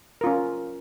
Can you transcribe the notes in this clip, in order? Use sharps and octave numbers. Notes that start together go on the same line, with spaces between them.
C#4 F4 A#4